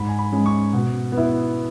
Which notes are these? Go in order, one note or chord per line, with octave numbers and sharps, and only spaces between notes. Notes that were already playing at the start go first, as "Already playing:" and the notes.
Already playing: G#2 B5
G#5
B5
G#3 C#4
C#6
B2
B3
E4